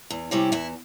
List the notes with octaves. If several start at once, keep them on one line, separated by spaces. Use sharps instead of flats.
E2
C3 G3 C#4 E4
E2 E4